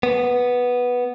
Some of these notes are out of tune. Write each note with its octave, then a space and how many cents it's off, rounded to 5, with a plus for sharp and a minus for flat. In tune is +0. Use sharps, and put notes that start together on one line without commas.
B3 -5